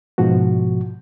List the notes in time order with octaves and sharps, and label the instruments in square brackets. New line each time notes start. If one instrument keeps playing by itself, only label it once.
[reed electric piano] G#2 B2 F3 F#4